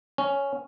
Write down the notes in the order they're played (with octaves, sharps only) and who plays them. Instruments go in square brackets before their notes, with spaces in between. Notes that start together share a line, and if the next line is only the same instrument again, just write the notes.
[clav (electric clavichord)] C#4